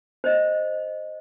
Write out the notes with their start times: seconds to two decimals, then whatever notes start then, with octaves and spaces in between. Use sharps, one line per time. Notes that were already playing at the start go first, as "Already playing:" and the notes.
0.24 C5 D#5